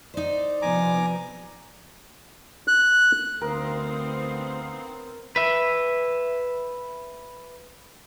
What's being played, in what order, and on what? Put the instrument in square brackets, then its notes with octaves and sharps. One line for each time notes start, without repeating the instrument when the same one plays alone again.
[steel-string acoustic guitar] D#4 C5 [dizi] D5
[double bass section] C3 F3 B3 [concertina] G#5 A#5 D6
[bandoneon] F#6
[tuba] D2 [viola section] B3 C4 C5 [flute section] D#4 F5 D#6 [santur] A#4
[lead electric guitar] B4 E5